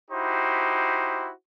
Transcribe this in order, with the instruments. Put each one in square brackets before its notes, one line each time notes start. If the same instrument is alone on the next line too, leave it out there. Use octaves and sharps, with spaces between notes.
[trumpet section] D#4 E4 F#4 G4 C5